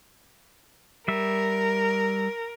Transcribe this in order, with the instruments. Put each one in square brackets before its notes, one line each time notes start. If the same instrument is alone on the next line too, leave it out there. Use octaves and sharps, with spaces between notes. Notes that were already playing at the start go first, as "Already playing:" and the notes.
[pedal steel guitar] G3 E5 [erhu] A#4